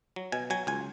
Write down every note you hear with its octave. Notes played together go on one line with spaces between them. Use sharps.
F#3
B2 G#5
F#3 G#5
C#2 G#5